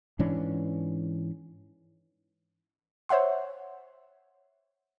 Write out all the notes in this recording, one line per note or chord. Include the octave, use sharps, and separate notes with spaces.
G#2 E3 C#4 D4
C5 C#5 E5 F#5 C6